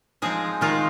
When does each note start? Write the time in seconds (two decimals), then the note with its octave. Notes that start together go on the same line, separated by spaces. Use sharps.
0.22 F3 G#3 C4 D#4 G#4
0.61 D#3 G#3 D#4 F4